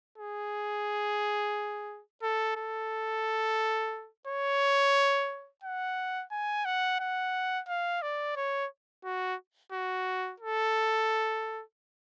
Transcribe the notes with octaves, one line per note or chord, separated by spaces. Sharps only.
G#4
A4
A4
C#5
F#5
G#5
F#5
F#5
F5
D5
C#5
F#4
F#4
A4